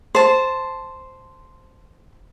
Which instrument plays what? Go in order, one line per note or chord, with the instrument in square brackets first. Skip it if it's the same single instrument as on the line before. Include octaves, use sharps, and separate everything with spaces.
[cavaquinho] C5 A5